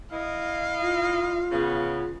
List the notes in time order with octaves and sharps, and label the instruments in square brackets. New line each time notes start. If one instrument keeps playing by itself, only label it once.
[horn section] E4 D#5 [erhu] F5
[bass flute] F4
[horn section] C#3 B3